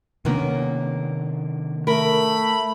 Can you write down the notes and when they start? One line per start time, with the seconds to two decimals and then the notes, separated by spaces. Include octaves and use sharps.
0.25 C3 D#3 A#3 B3 C#4 D4
1.87 A3 A#4 B5